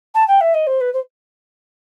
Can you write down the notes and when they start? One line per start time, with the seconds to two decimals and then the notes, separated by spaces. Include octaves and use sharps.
0.14 A5
0.28 G5
0.41 E5
0.54 D#5
0.67 C5
0.81 B4
0.93 C5